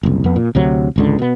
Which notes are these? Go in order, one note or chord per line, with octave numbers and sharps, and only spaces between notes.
F#1 C2
F2 B3
A#2
D2 C3 F#3
G#1 C#2 D3
B2 B3